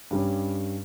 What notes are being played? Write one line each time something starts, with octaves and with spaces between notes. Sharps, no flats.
G2 G3 C#4